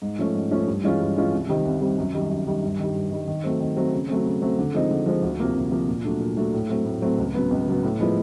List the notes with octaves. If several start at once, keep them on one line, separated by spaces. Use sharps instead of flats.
G#2
F3 A3 C#4
G#2
F3 A3 C#4
G2
E3 G#3 C#4 F4
G2
E3 G#3 C#4 F4
C2
C3 D#3 G3 C4
C2
C3 D#3 G3 C4
F#2
D#3 G3
F#2
D#3 G3
G2
D#3 G3
G2
D#3 G3
D#3
F#3 A3 C4
D#3
F#3 A3 C4
C#3
F#3 A3 C4
C#3
F#3 A3 C4
D3
F3 G#3 C4 D#4
D3
F3 G#3 C4 D#4
D2
C3 F3 A#3
D2
C3 F3 A#3
A#2
F#3 A3 D4
A#2
F#3 A3 D4
A2
F#3 A3 C4
A2
F#3 A3 C4
C#2
C#3 F#3 B3
C#2
C#3 F#3 B3
A2
F3 G#3 B3 E4